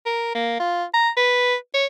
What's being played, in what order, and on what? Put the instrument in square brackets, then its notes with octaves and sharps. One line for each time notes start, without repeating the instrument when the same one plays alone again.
[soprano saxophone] A#4
A#3
F4
A#5
B4
C#5